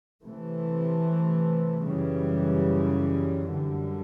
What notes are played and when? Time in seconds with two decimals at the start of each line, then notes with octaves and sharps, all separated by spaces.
0.24 C3 E3 A3
1.87 F#2 C#3 E3 G3
3.52 F#2 D3 G3